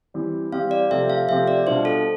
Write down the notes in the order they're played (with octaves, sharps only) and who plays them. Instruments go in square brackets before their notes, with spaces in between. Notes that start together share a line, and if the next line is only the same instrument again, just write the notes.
[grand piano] E3 G3 C4 G4
[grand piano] E3 G3 C4 G4 [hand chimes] F5
[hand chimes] D5
[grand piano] C3 F3 A3 C4 G4 [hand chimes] E5
[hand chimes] F5
[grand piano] C3 F3 A3 C4 G4 [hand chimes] E5
[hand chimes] D5
[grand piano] B2 G3 D4 F4 [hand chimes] C5
[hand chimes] A4